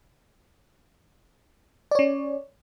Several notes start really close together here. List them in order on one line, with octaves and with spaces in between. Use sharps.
D5 C#5 C#4